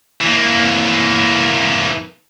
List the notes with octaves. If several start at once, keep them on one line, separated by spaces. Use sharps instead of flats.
E3 A#3